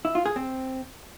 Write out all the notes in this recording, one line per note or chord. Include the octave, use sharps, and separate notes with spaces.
E4
F4
G#4
C4